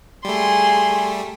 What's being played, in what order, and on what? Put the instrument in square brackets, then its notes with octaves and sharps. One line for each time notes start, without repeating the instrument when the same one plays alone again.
[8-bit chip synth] G3 A3 [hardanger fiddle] G#4 C6